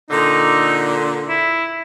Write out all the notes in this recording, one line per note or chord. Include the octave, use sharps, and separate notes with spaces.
A#2 D3 D#4
E4